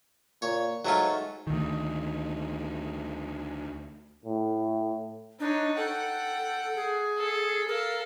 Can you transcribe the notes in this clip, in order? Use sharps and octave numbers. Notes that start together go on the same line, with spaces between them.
A#2 C#5
G#2 F#3 A3 F4
D2 D#3
A2
D4 D#4 C#5
A4 F#5 G5
G#4
A4
A4 A#4 F5